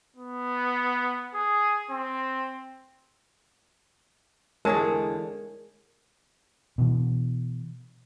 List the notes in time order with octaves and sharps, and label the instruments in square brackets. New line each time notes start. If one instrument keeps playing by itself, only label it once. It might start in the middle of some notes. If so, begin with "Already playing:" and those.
[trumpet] B3
G#4
C4
[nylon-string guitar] E2 D3 A5 [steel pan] G#3 G#4 C#5 [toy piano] A#4
[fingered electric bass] B2 E3